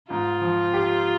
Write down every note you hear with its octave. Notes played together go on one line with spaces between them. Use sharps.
G#2 F4
F3
G4